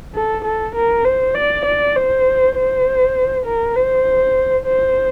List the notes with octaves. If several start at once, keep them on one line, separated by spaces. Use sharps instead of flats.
A4
A4
A#4
C5
D5
D5
C5
C5
A#4
C5
C5